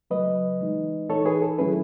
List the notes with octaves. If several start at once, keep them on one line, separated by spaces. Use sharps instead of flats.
C#3 F#3 A3 B4 D#5
E3 G#3 D#4
E3 A3 D#4 A4 C#5
G#4 B4
A4
D#3 F#3 A3 C#4 E4 G#4 B4